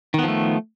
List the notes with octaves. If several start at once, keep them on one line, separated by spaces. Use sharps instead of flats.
D#3 F3 A3 B3